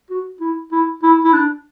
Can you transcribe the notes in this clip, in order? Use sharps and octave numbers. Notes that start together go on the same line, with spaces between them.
F#4
E4
E4
E4
E4
D4